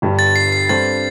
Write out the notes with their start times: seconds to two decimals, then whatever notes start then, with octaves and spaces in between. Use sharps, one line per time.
0.02 G1 G2 G3
0.19 A6
0.36 C7
0.52 C7
0.69 G2 G3 C4 A4 C5 A6